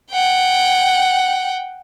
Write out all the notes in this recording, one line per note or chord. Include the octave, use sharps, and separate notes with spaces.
F#5 G5